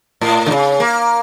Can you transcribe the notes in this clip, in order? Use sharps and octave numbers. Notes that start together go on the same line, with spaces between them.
A2
D3
C#3
A#3